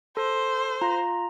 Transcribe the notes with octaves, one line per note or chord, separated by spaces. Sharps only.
A4 C5
F4 A#5